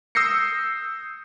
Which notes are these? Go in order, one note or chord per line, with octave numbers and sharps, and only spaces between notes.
D#6 E6 G6 A#6 C7 C#7